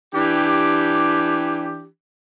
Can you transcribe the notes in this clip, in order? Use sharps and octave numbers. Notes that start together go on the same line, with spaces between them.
E3 D4 G4